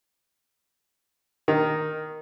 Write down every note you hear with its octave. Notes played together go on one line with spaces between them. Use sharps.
D#3